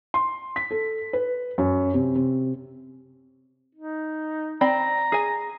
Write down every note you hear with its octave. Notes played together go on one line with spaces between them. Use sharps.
C6
B6
A4
B4
F#2
C3
C3
D#4
C4 D5 A#5 B5
G#4 G#5